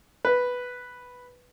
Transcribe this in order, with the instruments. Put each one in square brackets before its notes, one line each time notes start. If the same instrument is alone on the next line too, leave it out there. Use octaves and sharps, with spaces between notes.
[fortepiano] B4